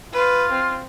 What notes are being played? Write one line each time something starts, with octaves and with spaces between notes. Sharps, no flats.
F4 B4
C4